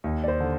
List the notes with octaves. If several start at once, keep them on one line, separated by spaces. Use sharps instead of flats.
D#2
D5
C5
D3